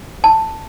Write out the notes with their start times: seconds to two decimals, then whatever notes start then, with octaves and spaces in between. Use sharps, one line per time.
0.24 A5